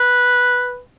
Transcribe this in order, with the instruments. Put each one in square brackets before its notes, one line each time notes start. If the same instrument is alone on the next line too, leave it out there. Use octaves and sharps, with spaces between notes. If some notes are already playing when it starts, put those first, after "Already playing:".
Already playing: [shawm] B4